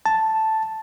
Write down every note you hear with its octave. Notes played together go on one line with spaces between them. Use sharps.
A5